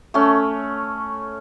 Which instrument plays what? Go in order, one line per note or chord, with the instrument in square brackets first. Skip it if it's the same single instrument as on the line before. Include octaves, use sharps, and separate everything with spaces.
[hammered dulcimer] A3 C#4